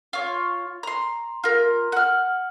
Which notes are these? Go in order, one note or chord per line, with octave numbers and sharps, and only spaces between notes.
F4 C#5
A#5 C6
F4 A#4
F#5 F6